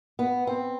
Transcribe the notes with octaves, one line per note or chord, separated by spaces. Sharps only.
B3
C4